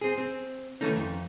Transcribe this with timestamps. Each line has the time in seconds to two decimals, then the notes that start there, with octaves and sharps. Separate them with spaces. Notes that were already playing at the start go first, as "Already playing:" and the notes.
0.01 C4 G#4
0.18 C4
0.81 D#3 E3 A3 C#4 D#4
0.96 F2